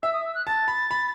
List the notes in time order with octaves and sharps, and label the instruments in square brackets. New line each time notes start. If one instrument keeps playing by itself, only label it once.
[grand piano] E5 [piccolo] E6
[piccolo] D#6
E6
F#6
[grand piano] A5 [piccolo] A6
[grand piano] B5
B5